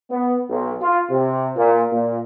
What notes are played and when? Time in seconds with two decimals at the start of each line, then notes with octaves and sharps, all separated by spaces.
0.10 B3
0.49 B1
0.81 F4
1.10 C3
1.56 A#2
1.91 A#2